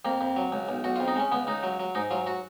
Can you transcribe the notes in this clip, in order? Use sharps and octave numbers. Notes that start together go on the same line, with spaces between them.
F2 A#3
F2
F#3
C#2
B1
B1 F#4
F2 F4
D#4
G#3 C#4
C#2 B3
C#2 D#4
F#3
F#3
G#2 D#4
F#3 F4
F#4